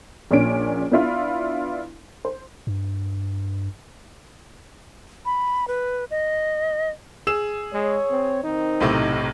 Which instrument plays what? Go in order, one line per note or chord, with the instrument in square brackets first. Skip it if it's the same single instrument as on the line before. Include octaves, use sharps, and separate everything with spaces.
[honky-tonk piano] A#1 A#2 C#4 D4 C#5 D7
B3 D4 E4 F4
C5
[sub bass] G2
[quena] B5
B4
D#5
[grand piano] G#4 E6 E7
[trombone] G#3 [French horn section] C#5
[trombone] C4
[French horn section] D#3 C4 [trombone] D#4
[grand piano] B1 A2 C3